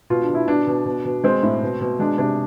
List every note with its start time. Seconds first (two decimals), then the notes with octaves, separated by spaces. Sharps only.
0.10 B2 F4
0.22 D4
0.29 B2
0.34 E4
0.47 B2 D4
0.67 B2
0.85 B2
1.05 B2
1.24 G#3 C4
1.43 A2
1.62 B2
1.81 B2
1.99 G#3 D4
2.18 C3 D4